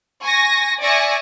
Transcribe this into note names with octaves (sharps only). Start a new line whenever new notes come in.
G#5 C#6 A#6
D5 E5 G#5 C#6 A#6 C#7